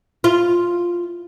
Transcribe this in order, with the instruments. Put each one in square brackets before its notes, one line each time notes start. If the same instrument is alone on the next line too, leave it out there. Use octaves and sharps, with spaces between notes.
[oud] F4